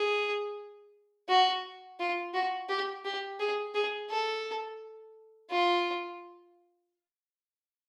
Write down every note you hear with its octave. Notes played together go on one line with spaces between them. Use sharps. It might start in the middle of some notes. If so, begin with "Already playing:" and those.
Already playing: G#4
F#4
F4
F#4
G4
G4
G#4
G#4
A4
F4